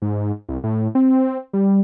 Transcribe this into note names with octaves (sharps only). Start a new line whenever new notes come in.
G#2
C2
A2
C4
G3